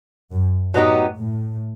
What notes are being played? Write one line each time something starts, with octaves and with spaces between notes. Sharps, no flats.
F#2
A2 F#3 B3 D#4 G4
A2